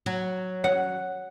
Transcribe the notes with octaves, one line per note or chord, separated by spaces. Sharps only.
F#3
C#5 F#5